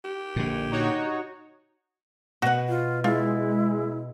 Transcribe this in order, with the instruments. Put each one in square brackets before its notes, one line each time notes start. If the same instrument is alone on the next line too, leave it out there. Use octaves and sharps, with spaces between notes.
[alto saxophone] G4
[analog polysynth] A#1 [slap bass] A#2 D3
[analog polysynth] D#4 F#4 C#5
[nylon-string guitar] B2 B3 [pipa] F#4 F#5
[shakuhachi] F4
[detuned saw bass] G#3 [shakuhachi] E4 [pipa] F4